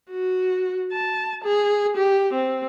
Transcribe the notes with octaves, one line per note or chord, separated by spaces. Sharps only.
F#4
A5
G#4
G4
C4